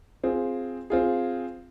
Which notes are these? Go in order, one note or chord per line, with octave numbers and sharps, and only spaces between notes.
C4 F4 G#4
C4 F4 G#4